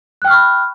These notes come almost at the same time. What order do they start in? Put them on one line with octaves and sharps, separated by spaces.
F#6 G5 F6 C#6 B5